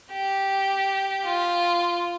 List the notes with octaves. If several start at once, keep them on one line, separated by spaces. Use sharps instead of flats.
G4
F4